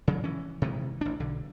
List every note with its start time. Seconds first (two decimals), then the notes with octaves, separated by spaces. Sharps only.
0.08 C#3 F#3
0.24 E3 C#4
0.62 C3 D#3 E3 G#3
1.01 A1 D4
1.20 B1 D3